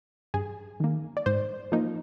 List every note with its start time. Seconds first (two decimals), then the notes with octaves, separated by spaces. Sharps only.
0.34 G2 G#4
0.80 D#3 A#3
1.17 D5
1.26 G#2 C5
1.72 F3 A#3 D#4